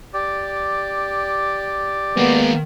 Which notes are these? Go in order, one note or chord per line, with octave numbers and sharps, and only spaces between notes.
G4 D5
D#3 G#3 A#3 B3